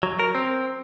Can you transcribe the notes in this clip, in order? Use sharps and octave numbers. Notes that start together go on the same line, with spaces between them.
F#3
A#4
C4